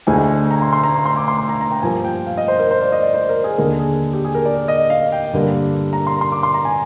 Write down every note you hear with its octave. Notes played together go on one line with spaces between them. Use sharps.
D2 D3 G#3 G#5
A#5
C6
C6
A#5
C6
C6
D6
C6
C6
A#5
A#5
G5
G2 F3 A#3 G#5
G5
F5
D#5
C5
A#4
C5
D5
D#5
D5
C5
A#4
G#4
D#2 D3 G#3 A#4
G#4
G4
G#4
A#4
D5
D#5
F5
G5
G2 D3 G3 A#3
A#5
C6
C6
D6
C6
A#5
G#5